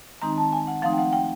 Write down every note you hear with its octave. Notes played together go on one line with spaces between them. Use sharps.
D#3 G#3 C4 D#4 A#5
A5
G#5
F#5
F3 A3 C4 D#4 F5
G5
F#5
G5